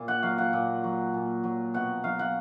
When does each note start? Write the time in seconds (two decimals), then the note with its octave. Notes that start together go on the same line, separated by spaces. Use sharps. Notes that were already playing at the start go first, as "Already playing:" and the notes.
Already playing: A#2
0.08 F#5
0.23 F#3 F5
0.38 F#5
0.53 A#2
0.84 F#3
1.14 A#2
1.44 F#3
1.74 B2 F#5
2.04 F#3 F5
2.19 F#5